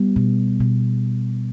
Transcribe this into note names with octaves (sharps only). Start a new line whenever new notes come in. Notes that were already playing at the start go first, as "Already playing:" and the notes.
Already playing: G3 B3
B2
B2